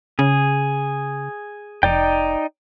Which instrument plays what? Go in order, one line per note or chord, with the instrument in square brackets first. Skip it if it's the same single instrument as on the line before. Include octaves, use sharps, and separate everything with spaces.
[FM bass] C#3 [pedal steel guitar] G#4
[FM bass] F1 [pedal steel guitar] D#4 D5 G5